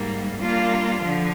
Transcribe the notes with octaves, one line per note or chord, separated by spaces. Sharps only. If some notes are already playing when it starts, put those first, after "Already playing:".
Already playing: G#2 G3 A#3
G3 A#3 D4 F4
D3 F3